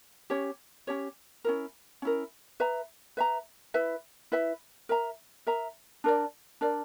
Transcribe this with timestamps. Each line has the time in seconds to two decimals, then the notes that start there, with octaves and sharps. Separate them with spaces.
0.30 C#4 G4 C#5
0.87 C#4 G4 C#5
1.45 C#4 E4 A#4
2.02 C#4 E4 A#4
2.60 B4 E5 A#5
3.17 B4 E5 A#5
3.74 E4 B4 E5
4.32 E4 B4 E5
4.89 A#4 E5 A#5
5.47 A#4 E5 A#5
6.04 D4 A#4 D5
6.61 D4 A#4 D5